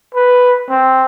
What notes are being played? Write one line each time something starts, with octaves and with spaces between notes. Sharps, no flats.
B4
C4